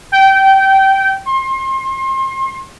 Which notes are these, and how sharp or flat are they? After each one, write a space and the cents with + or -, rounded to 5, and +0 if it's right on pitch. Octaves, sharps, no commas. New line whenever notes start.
G5 -20
C6 +35